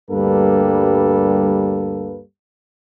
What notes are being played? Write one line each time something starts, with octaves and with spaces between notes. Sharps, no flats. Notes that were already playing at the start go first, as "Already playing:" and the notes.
D2 G2 G3 A#3 A4 B4